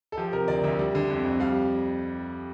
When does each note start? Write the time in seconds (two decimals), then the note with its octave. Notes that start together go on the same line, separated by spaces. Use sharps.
0.12 A4
0.17 F3 G4
0.33 C3 A#4
0.48 D2 D5
0.64 D2 E5
0.79 G3
0.95 D3
1.10 F2
1.25 F2
1.40 G3 F5